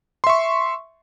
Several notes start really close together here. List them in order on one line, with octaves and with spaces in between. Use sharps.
C6 E5 C#6